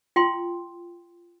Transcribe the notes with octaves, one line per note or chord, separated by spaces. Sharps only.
F4 G5 C6